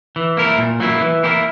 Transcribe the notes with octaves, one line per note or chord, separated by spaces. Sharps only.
E3
A#3 E4 A#4
A#2
F#3 A#3 E4
E3
A#3 E4 G4 A#4